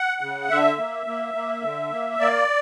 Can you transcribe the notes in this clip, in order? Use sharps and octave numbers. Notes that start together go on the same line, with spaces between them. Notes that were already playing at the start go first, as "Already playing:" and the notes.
Already playing: F#5
C#3
D3 E5
A#3
A#3
A#3
D3
A#3
A#3 D5